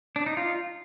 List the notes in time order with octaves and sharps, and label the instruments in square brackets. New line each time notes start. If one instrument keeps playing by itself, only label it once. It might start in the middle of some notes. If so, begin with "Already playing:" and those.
[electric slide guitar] D4
D#4
F4